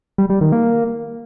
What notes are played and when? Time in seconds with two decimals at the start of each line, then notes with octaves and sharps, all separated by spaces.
0.18 G3
0.30 G3
0.41 D#3
0.52 A#3